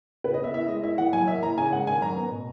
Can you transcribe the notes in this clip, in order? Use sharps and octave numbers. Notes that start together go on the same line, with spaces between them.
C#3 B4
D#5
B3 E5
E4 E5
G#3 D#5
E4 E5
E3 F#5
F#3 G#5
A#3 E5
E3 A#5
C#3 G#5
G#3 F#5
D#3 G#5
F#2 A#5
B3
B2